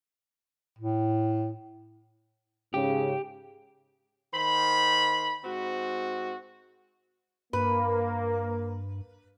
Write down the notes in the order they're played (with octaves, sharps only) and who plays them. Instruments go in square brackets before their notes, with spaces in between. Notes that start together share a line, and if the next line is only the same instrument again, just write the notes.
[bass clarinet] A2
[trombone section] G#2 C#3 [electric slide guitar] G4
[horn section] D#3 C5 B5
G#2 C4 F#4
[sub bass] G2 [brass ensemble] A#3 [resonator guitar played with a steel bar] B4